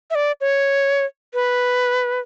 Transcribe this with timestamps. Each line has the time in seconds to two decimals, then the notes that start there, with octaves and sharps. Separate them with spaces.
0.11 E5
0.15 D5
0.41 C#5
1.34 B4